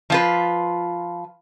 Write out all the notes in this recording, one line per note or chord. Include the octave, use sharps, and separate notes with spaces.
F3 F4 B4